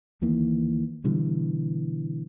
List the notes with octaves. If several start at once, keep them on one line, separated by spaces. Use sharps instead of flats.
D2 D#3 E3 A#3
B2 D3 E3 G3